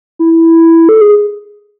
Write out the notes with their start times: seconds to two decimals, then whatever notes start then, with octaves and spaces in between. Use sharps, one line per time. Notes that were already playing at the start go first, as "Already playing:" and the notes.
0.19 E4
0.89 A4
1.01 G#4